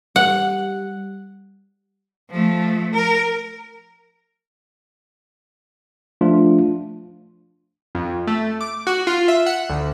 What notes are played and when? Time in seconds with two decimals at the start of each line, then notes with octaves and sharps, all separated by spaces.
0.16 G3 F#5
2.31 F3 A3
2.94 A#4
6.21 F3 A3 D4 F4
7.95 F2
8.27 A3
8.61 D6
8.87 F#4
9.07 F4
9.28 E5
9.46 F#5
9.70 D2